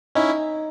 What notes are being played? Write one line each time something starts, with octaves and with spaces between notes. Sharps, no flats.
C#4 D#4 E4